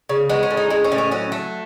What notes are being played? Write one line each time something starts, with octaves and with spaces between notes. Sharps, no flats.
C#3
G#3 B3
C#4
A2
D#4
G#3 C#4
C#4
A2
C#4
F#3 C#4
A3